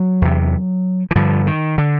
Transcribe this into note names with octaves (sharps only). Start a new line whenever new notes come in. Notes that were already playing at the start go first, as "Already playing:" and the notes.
Already playing: F#3
E2 C3
E3
G2 D3 F3
D#3
D3